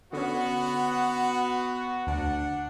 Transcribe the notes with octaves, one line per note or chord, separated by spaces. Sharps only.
D3 B3 C#4 F#4
D2 D4 F#5